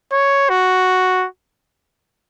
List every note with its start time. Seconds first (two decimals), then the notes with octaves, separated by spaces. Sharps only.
0.12 C#5
0.49 F#4